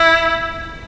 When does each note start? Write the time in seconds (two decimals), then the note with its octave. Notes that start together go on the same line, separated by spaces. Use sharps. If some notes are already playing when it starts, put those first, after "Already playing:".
Already playing: E4